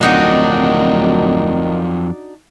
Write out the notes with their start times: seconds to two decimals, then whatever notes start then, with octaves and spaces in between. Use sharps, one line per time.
0.01 D1 F2 D#3 F#3 D4 D#4 F#4